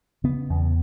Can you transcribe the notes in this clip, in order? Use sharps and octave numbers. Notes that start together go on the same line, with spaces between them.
C#3 B3
E2